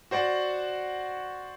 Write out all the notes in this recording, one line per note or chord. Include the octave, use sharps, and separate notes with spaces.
F#4 C5 D5 F#5